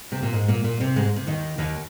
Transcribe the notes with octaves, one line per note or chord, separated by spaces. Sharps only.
C3 C4
A#2 A#3
G#2 G#3
A#2 A#3
A#2 A#3
C3 C4
G#2 G#3
C3
D#2 D#3
D#2 D#3